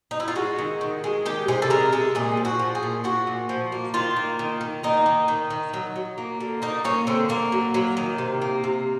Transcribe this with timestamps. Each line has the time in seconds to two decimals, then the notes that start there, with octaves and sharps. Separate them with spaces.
0.11 D#4
0.20 E4
0.28 F4
0.36 G#3 F#4
0.58 D#3
0.81 D#3
1.04 G#3
1.26 D#3 G4
1.48 C3 G#4
1.62 A4
1.70 G#3 A#4
1.92 G#3 A4
2.15 A#2 G#4
2.37 F3
2.45 F#4
2.59 F3
2.75 G#4
2.83 A#2
3.04 F3 F#4
3.27 A#2
3.49 F3
3.72 A#3
3.94 D#3 F4
4.16 A#3
4.39 D#3
4.61 D#3
4.83 A#3 D#4
5.06 D#3
5.28 D#3
5.50 D#3
5.73 F#3
5.96 F#3
6.18 A#3
6.40 D3
6.62 A#3 D#4
6.84 A#3 C#4
7.07 D3 C4
7.29 D3 A#3
7.52 F#3
7.74 F#3
7.97 D#3
8.18 C3
8.42 A#3
8.64 C3